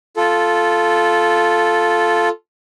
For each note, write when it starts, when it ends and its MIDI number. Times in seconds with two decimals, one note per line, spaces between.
0.17 2.29 65
0.17 2.29 69